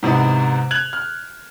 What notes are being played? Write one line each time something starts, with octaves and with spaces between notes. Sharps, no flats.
G#2 C3 E3 B3 D#4
F#6 G#6 F7 F#7
F6